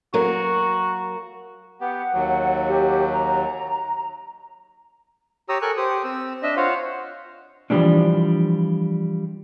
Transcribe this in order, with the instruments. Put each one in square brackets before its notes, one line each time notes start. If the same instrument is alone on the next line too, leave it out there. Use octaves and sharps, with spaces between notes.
[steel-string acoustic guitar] F#3 A#3 A#4 [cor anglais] F#4
[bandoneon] B3 G4 [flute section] F#5
[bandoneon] D#2 F#3
[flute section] G4
A#5
[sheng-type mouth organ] G4 C#5 A#5 D#6 E6
A4 A#4 G#5 C#6 F#6
G4 C5 D#6
C4 E6
D4 D#5 E5
F4 C5 C#5 F5 F#5
[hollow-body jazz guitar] E3 F3 G3 A3 C#4 D4